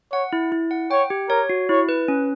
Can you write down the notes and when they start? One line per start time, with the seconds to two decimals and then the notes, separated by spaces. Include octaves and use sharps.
0.12 C#5 F#5
0.33 E4
0.52 E4
0.71 F#5
0.91 C#5 G5
1.10 G4
1.29 A#4 C#5
1.50 F#4
1.69 E4 C#5
1.89 B4
2.08 C#4